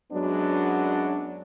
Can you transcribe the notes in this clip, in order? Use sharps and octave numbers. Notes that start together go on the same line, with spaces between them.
F#2 F#3 G#3 B3 D4